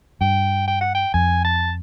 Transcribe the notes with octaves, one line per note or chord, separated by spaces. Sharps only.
G2 G5
G5
F#5
G5
F2 G#5
A5